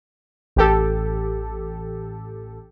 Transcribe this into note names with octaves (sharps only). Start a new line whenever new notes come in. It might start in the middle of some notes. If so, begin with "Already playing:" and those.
A1 G4 A4